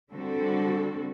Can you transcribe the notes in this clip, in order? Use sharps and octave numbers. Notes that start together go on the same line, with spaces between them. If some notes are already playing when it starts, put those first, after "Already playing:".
D3 G3 C4 F#4 A4